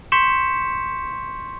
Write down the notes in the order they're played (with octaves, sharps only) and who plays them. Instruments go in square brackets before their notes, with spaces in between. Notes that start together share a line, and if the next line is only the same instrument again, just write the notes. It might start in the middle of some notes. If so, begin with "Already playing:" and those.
[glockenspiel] C6 C#6 G6 B6 C#7 E7